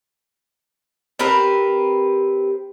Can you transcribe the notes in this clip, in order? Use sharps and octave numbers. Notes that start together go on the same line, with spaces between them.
C4 G4 A#4 B4